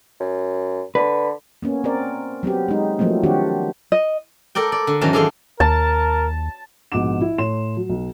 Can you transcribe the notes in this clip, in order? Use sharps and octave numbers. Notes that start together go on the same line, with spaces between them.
F#2
D3 B4
A#3 B3 C#4
C4 A#4 D5
F#3 B3 C4 G4
G#3 D#4
F3 F#3 A3 A#3 C4
D#3 C4 D4 F#4 G4
D#5
A4 A#4 D5 G5
D5
D3
E2 G#2 D#3 F#3 C#4 A5
D#3 D4 G#4 A4 F5 C6
D#2 A#4 A5
A#1 G#2 B2 F#5 D6 E7
E4
A2 C#5 C6 E7
F#3
B1